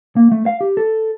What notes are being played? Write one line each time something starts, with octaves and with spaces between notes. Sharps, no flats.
A#3
A3
F5
G4
A4